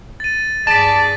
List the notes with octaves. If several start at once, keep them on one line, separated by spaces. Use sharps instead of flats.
A6 D#7
G2 G#4 D5 A5 A6 B6